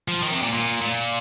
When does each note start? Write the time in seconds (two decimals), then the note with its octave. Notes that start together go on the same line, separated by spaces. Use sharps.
0.08 F3
0.23 D#3
0.32 C3
0.42 A#2
0.52 A#2
0.81 A#2